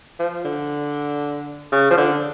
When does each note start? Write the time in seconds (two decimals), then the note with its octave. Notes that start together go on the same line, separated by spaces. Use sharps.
0.19 F3
0.44 D3
1.72 C#3
1.90 F3
1.97 D3